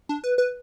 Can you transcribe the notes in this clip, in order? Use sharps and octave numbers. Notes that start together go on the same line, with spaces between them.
D4
B4
B4